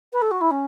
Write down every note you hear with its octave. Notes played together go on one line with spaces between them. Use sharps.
B4
A4
F#4
E4
C#4